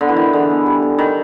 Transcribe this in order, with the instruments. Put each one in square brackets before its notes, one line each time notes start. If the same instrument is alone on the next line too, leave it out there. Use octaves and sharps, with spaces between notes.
[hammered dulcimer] D3 [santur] B3
[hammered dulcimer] E3
[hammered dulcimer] D#3 [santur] E4
[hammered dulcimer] D3 [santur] G#4
[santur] B3
G3
B3
[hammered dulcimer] D#3 [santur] D#4